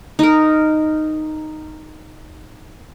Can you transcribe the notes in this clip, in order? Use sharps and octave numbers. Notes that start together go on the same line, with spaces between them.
D#4 A#4